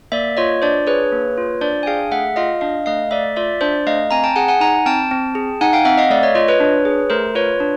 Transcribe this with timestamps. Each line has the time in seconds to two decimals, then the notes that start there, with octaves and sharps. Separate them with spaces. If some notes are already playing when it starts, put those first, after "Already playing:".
0.12 A#3 D5 E5
0.37 F4 C#5 D#5
0.62 D4 C5 D5
0.87 G#4 B4 C#5
1.12 A#3
1.38 F4
1.61 D4 C5 D5
1.83 G#5
1.86 G#4 F5 G5
2.11 A3 E5 F#5
2.36 F4 D#5 F5
2.61 D4 D#5 F5
2.86 A3 D#5 F5
3.11 A3 D5 E5
3.36 F4 D5 E5
3.61 D4 C5 D5
3.87 A3 D#5 F5
4.11 C4 G#5 A#5
4.24 G5 A5
4.36 G#4 F#5 G#5
4.48 F#5 G#5
4.60 D#4 G#5 A#5
4.86 C4 G5 A5
5.11 C4
5.35 G#4
5.61 D#4 F#5 G#5
5.73 F5 G5
5.85 C4 E5 F#5
5.98 D#5 F5
6.10 A3 D5 E5
6.23 C#5 D#5
6.35 F4 C#5 D#5
6.48 B4 C#5
6.60 D4
6.85 G#4
7.10 A3 A#4 C5
7.35 F4 B4 C#5
7.60 D4